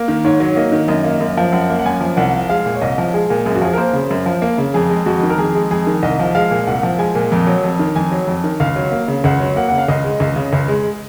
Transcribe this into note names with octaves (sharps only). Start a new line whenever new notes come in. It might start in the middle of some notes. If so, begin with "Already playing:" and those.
Already playing: A#3
D#3
G#2 C#5
F#3
A#3 D#5
D#3
F#2 D#5
A#3
F#2
F3
F#2 F#5
A#3
F#5
F#2 G#5
F3
C2 F#5
F3
G#3 F5
A#2
C#5
C2 D#5
F3
G#3 G#4
A#2
F#2 G#4
F#4
F3 G#4
A#4
A#3 C5
C#3
F#2
F3
A#3
C#3
F2 G#4
G#3
F2 F#4
D#3
A#4
F2 G#4
G#3
F2 G#4
D#3
C2 D#5
F3
G#3 F5
A#2
C2 F#5
F3
G#3 G#5
A#2
F2
F#3
F2
D#3
F2 G#5
F#3
F2
D#3
C#2 F5
F#3
A#3
C#3
C#2 F#5
F#3
A#3 F#5
C#3 F#5
F5
C#2 D#5
G#3
C#2
C#3
C#2
G#3